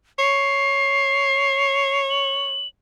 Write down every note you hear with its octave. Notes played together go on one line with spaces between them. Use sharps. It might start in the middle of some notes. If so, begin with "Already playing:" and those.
C#5 C7
F#7